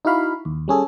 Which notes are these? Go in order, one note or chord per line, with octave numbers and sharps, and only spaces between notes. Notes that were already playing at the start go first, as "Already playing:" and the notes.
D#4 E4 F#4 F5 B5
D#2
G3 C#4 G#4 A4